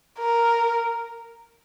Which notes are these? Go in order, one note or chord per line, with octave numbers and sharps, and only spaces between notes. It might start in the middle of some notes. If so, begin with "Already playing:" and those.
A#4